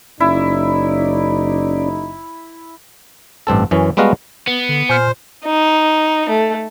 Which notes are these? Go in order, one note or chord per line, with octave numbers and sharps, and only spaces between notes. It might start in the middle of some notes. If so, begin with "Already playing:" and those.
F#1 C#4 D#4 E4 D5
A1 G2 C4 A4
F#2 E3 C#4
G3 G#3 B3 F#4 F5 A#5
B3
D3
A#2 C5 G#5 C6 F6
D#4
A3